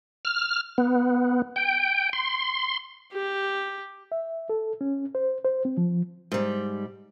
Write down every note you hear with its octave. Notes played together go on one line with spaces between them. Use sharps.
F6
B3
G5
C6
G4
E5
A4
C#4
C5
C5
C4
F3
G#2 G3